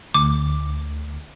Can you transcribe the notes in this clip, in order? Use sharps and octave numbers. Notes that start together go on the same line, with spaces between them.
D2 D6